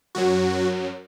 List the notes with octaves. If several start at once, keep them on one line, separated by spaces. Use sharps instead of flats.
F#2 F#3 F#4